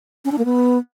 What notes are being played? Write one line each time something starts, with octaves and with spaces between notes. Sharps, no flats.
C#4
D4
A#3
B3